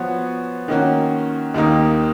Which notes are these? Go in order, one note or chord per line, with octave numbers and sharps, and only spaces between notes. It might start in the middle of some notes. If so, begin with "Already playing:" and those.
Already playing: F3 B3 F#4 C#5
D#3 A#3 C#4 F#4
D#2 D#3 A#3 D#4